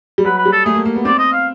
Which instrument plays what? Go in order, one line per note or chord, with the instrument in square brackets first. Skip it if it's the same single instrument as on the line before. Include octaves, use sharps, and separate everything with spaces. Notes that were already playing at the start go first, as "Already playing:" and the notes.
[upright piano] G3
[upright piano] F#3 [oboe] B4
[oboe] B4
[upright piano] G3
[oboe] A4
[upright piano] A3 [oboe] G#4
[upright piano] A#3
A#3
B3
[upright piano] C4 [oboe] D5
[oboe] D#5
F5